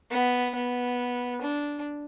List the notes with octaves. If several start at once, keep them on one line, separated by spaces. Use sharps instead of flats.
B3
B3
D4